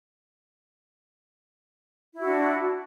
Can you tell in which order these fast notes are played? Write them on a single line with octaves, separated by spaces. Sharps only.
E4 F#4 D4